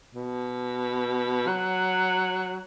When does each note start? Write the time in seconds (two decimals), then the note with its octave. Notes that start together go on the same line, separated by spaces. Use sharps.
0.15 B2
1.47 F#3